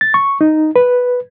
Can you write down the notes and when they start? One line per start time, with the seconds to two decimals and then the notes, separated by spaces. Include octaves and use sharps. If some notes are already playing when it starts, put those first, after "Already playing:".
0.01 A6
0.14 C#6
0.41 D#4
0.76 B4